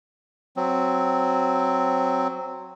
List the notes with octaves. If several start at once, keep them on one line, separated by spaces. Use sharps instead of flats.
F#3 C4